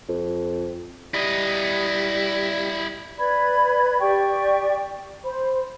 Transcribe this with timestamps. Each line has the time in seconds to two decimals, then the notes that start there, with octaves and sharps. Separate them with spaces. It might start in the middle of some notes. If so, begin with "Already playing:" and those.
0.09 F2
1.14 G3 E4 D#5
3.19 B4 D5 B5 G#6
4.00 G4 D5 G5 C#6
5.24 C5 B5